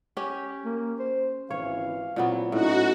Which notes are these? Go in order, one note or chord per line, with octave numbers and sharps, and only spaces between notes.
C#4 G4
A#3
C5
G#1 C#3 E3 C#5 F5
A#2 F#3 B3 C4 E4
A2 C#4 D#4 F#4